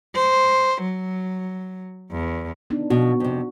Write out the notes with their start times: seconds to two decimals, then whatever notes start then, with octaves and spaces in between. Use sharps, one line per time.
0.16 C5
0.82 F#3
2.11 E2
2.70 B3 D4 D#4
2.90 B2 F3 B3 F#4
3.20 F2 C3